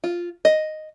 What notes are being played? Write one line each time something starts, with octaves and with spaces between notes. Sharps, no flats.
F4
D#5